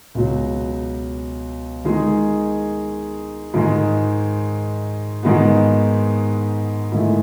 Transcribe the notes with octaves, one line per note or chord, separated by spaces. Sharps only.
C#2 B2 F#3
D#3 G#3 D#4 G#4
G#2 D#3 G#3
G#2 D#3 G#3 B3
G#2 D#3 A3 E4 G#4